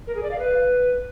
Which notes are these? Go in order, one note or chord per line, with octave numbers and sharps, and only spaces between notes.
A#4
G#4
D5
F5
B4